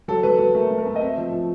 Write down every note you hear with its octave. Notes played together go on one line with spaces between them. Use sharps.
F#3 A4
F#3 B4
F#3 B4
A3 A#4
A3
A#4
A3
D#5
C4 E5
F3
F3